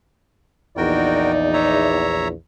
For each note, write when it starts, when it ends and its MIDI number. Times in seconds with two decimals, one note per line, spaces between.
0.77 2.33 34
0.77 2.33 40
0.77 2.22 63
0.77 1.32 66
0.77 1.32 70
0.77 2.18 74
0.77 1.32 79
1.53 2.28 73
1.53 2.28 76
1.53 2.28 82